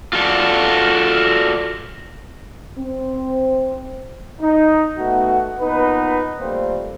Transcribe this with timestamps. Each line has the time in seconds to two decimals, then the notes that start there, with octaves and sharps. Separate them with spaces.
0.13 F4 F#4 A4 C#5 D5
2.78 C4
4.40 D#4
4.97 A3 B3 D#4 F#4
5.59 A#2 B3 D#4 B4
6.40 F3 G3 A3 A#3 C4